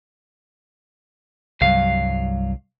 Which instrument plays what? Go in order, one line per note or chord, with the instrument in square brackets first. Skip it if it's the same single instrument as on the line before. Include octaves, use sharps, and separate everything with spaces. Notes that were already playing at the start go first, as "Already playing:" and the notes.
[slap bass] C2 F#3 [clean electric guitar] G2 F5